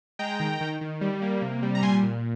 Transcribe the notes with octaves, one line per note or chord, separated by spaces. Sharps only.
G#3 G5 A#5
D#3
D#3
D#3
G3
A#3
C3
G3
A#5
A#2 G#5 C6
A#2